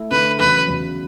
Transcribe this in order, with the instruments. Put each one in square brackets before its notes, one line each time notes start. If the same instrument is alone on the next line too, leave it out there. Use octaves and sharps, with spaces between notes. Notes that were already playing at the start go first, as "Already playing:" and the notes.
Already playing: [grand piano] A3 E4
[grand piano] D3 A3 E4 [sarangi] B4
[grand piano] E2 C#3 F#3 [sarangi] B4
[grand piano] E2 C#3 F#3